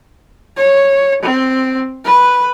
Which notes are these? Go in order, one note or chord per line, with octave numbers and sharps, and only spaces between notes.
C#5
C4
B4